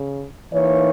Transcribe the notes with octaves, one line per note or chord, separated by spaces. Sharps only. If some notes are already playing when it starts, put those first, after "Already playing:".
Already playing: C#3
E3 A#3 D#4 C#5